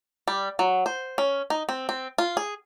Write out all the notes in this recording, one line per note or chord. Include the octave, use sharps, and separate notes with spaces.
G3
F#3
C5
C#4
D#4
C4
C4
F4
G#4